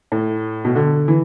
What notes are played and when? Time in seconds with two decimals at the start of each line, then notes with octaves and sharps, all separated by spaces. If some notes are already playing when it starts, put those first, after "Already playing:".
0.12 A2
0.65 B2
0.76 D3
1.08 E3